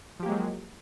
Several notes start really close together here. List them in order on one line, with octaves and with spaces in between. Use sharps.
F3 G4 A#3 G#3 F#3